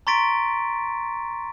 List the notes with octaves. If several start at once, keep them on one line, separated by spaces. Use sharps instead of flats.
A#5 C6 C#6 A6 B6 D7